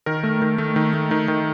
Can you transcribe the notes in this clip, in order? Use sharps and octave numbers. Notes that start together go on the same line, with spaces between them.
D#3 A#4
A3
D#3
A3
D#3
A3
D#3
D#3